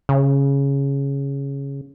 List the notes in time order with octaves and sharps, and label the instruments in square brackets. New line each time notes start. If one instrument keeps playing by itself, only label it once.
[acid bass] C#3